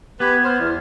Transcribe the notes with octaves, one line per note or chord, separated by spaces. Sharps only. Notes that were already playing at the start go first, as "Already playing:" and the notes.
B3 G4 B4 G#6
C5 F6
E2